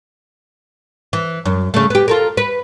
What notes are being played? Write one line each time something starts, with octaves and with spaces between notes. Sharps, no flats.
E3
F#2
C#3 A3
B3 G4
F4 A4 A#4
B4